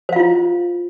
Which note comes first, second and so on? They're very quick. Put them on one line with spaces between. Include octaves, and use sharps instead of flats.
C5 F5 F4 E4